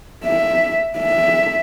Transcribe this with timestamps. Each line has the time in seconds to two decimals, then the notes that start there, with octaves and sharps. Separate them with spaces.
0.25 E5
0.98 E5